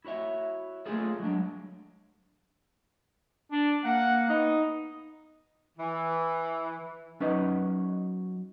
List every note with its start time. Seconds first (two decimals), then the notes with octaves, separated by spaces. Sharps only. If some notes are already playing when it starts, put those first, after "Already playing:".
0.05 E4 F#4 C#5 E5
0.85 A3 A#3 C#4 F4 G#4 A4
1.20 F#3 G#3 D4
3.52 D4
3.84 A#3 F#5
4.29 B3 D#4
5.78 E3
7.20 F#3 C#4 D#4 B4 D#5